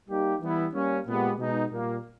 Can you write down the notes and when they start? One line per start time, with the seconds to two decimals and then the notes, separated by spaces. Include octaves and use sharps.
0.08 G3 A#3 D#4 G4
0.41 E3 G3 B3 E4
0.74 G3 A#3 C#4
1.07 A#2 G#3 B3 G4
1.39 B2 G#3 B3 D#4
1.72 A#2 G3 A#3